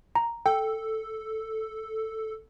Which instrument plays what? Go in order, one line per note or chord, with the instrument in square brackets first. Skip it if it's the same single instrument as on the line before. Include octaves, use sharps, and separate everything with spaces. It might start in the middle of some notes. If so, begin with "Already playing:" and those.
[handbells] A#5
[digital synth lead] A4 [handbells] G5